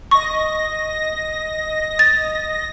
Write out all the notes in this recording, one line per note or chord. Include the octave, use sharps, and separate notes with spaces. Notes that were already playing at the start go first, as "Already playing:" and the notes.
D#5 C#6 A#6
A6